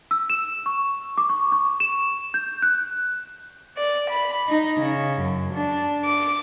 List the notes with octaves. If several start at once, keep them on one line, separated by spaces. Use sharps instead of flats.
E6
E7
C#6
D6
C#6
C#6
E7
G6
F#6
D5
B5
D#4
C#3
F#2
D4
D6